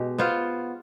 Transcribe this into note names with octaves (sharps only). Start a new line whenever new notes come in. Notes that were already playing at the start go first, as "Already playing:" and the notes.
Already playing: B2 G#3 G4
B3 F4 C5 F5